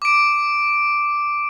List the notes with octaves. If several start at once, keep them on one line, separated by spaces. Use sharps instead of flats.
D6 D7